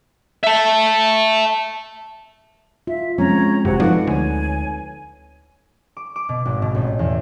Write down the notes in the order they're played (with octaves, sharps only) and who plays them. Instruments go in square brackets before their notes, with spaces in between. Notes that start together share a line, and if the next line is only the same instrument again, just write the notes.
[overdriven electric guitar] E5 A5
[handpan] F4 [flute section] E5
[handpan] F3 G#3 C4 [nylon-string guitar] C#4 [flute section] C#5 A#5
[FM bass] G1 [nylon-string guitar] C3 G4 [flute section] F#4 F#5
[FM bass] F3 [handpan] D#4 A4 B4 [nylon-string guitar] D5
[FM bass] D2 [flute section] C#5 G#5
[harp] D6
D6
B2
G#1
B2
A1
E2